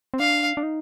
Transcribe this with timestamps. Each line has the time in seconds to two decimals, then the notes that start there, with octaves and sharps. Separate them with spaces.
0.14 C4
0.20 D4 F5
0.57 D4
0.63 D#4